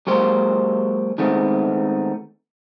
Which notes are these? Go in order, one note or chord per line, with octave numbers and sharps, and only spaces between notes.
F#3 G#3 A#3 G4 C5
D#3 G#3 A3 B3 C4